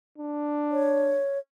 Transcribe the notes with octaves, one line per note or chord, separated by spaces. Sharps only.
D4
C#5